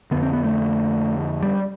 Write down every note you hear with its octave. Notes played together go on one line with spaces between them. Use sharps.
F2 D3 B3
C4
B3
A3
G3